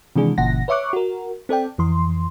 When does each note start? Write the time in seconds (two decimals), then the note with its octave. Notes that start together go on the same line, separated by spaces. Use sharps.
0.16 C3 D#3 E3 G#3 D4 G#4
0.38 G1 A#2 C#3 E3 F#5 A#6
0.68 B4 C#5 E5 C#6 D6 F#6
0.93 F#4 A#4
1.49 C4 A4 D5 G5
1.78 F2 E3 C6